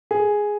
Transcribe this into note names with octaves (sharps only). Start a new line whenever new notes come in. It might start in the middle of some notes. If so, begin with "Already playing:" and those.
G#4